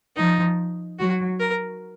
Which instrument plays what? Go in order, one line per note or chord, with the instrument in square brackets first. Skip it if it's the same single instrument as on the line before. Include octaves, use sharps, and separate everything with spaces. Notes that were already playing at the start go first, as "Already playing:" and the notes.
[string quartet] F3 [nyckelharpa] D#4
[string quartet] F#3 [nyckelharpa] F#4
[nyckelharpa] A#4